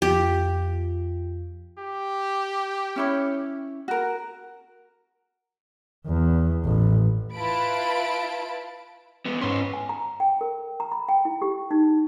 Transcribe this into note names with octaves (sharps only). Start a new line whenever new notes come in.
F2 F4 G4
G4
C#4 E4 C#5
F#4 A#4
E2
A1
E4 F4 B4 A5 B5 D7
G#3 B3
G#2 C#4 B4 C6
G#5
A#5
G5
A#4
A#5
B5
G5
E4
G4
D#4